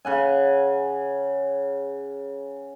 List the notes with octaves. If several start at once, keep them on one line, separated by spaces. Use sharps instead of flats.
C#3 F#5 G#5